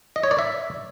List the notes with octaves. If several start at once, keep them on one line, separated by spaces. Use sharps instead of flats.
D#5
C#5
D5
E5